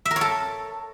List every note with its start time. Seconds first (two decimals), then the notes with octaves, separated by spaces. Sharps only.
0.05 E5
0.11 A#4
0.16 C#5
0.21 A4